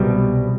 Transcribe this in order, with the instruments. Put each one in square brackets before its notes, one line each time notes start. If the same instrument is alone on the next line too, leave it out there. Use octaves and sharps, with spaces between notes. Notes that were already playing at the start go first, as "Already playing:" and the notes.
Already playing: [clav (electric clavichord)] C2 B2 G3